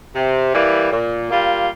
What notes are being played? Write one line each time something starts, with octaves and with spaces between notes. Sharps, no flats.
C3
E3 G3 A#3 E4
A#2
G3 A#3 F4